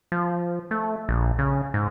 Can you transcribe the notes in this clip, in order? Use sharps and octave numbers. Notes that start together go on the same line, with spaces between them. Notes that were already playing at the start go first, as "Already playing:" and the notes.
F3
A3
A#1
C#3
G#2